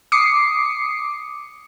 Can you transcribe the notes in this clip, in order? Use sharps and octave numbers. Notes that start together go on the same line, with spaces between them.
D6 D#6 C7 C#7